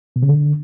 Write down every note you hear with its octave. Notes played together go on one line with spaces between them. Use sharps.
B2
C#3
D3